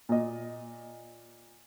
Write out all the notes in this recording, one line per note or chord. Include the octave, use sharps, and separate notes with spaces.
A#2 D#5